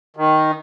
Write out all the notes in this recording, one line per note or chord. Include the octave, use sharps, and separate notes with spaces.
D#3